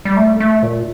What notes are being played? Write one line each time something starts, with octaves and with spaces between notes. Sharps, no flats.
G3
A3
A3
A#2